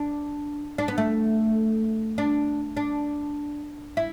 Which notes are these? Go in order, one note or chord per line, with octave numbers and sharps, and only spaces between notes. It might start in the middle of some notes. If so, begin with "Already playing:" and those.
Already playing: D4
D4
B3
A3
D4
D4
E4